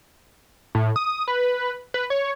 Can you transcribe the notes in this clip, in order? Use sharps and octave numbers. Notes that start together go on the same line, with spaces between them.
A2
D#6
B4
B4
C#5